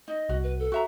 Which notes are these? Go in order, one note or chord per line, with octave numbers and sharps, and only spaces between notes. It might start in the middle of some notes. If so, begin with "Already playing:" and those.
D#4 D#5
C2 F#4
B4
A4
F#4 E5 A#5